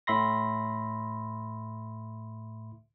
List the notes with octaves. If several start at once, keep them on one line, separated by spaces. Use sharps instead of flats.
A2 E5 B5 C6 A#6